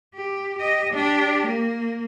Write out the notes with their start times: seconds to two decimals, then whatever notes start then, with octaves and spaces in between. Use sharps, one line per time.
0.15 G4
0.58 G4 D#5
0.93 D4 G4
1.46 A#3